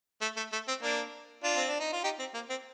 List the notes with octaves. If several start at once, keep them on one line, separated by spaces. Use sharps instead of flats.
A3
A3
A3
C4
A#3 D4
D4 F4
C4
D4
D#4
F4
D#4 G4
C4
A#3
C4